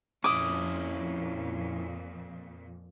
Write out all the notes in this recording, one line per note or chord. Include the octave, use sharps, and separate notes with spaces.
F2 A#2 C#4 E4 D6 D#6